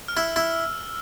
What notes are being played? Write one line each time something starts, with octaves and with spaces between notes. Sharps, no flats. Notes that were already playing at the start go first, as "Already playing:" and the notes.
F6
E4 E6
E4